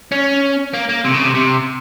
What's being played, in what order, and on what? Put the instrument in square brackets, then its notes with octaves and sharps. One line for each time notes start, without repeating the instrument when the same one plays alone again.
[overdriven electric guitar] C#4
A#3
A#3
C3
C#3
C3
C3